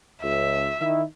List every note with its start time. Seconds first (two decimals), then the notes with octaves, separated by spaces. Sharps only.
0.22 C#2 E5
0.79 D#3 E4